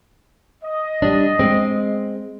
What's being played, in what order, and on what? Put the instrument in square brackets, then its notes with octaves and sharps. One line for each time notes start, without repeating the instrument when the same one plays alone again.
[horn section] D#5
[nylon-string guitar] G3 D4
G#3 C4